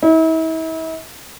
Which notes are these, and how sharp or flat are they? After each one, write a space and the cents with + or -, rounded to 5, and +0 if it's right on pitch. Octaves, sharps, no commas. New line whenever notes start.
E4 -40